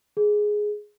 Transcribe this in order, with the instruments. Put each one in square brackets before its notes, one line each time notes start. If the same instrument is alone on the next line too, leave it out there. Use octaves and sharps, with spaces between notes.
[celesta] G#4